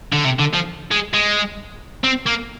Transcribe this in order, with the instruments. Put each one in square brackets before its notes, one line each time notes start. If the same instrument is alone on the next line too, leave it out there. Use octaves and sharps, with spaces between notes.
[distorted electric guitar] D3
C3
D3
F3
G#3
G#3
C4
A#3